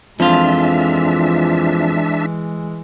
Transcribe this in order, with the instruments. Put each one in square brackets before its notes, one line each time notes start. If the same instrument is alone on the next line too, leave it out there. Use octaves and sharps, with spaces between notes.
[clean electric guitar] F2 F4 [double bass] E3 G#3 [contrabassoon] F3 [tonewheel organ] D4 E5